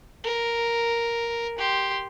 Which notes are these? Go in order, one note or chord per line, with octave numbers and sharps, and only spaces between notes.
A#4
G4 C6